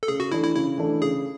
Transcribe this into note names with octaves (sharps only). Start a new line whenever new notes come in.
A4
C#3 G#4
F#4
E3 A3 D4 E4
E4
C#3 E4
E3 A3 D4
C#3 G#4